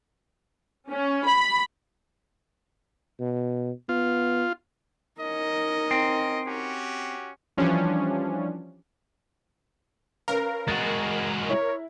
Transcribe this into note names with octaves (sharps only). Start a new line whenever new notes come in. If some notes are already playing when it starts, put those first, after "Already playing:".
C#4
B5
B2
B3 F4
C#4 D#4 A#4 D#5
C4
C#4 F#4 G4
E3 F3 G3 C#4 D4
C#4 A#4 B4 F5
G#3 F#4 F#6 A6
E4 C#5